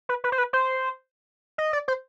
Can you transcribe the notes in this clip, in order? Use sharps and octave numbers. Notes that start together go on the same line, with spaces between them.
B4
B4
C5
B4
C5
D#5
D5
C5